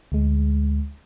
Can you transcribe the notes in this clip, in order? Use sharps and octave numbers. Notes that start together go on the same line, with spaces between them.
D2 G#3